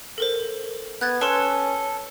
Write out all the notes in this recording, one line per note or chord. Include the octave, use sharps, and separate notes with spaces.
A4 A#4 C5
B3 F#6 G#6 A6
C#4 A4 B4 C6